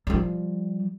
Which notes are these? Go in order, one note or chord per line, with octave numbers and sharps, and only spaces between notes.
F3 G3